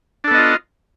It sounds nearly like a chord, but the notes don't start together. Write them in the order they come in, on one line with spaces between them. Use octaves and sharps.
D4 A4 B3 D#5 F4